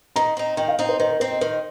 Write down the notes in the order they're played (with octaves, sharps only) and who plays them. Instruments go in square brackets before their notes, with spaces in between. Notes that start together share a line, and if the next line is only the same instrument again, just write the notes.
[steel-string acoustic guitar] D#3 [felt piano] A#5
[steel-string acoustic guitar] C4 D#4
[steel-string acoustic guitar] D#3 [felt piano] G5
[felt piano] F5
[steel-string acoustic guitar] C4 D#4 [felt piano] D#5
[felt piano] C5
[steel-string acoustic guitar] D#3 [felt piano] C5
[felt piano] A#4
[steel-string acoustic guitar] C4 D#4 [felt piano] C5
[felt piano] D#5
[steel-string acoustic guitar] D#3 [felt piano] C5